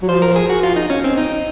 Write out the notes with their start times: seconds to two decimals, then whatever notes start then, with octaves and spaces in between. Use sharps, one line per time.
0.02 F#3
0.08 F3 C5
0.22 A#4
0.36 G#4
0.50 F#4
0.63 F4
0.76 D#4
0.90 C#4
1.04 C4
1.17 D#4